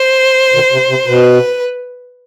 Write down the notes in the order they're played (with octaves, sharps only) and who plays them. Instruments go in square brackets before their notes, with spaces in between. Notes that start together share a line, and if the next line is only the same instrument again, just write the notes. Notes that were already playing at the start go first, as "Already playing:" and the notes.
Already playing: [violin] C5
[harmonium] B2 D#3
C3
C3
[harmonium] B2 [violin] B4